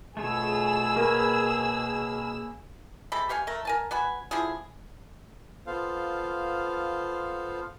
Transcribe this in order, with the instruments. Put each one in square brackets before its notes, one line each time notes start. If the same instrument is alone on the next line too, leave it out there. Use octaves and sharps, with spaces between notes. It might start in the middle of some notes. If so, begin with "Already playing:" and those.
[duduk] B2 [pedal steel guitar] A3 F4 C#5 [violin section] G#4 E6
[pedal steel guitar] A#3 B4 C#5 [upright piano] A#4
[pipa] C3 G#3 A4 B5
G4 C#5 F5 G#5
A3 A#4
A#4 G#5 A5
B3 F#4 G#5 B5
D3 F3 E4 G#4
[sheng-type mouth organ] B3 F4 A4 C5 F5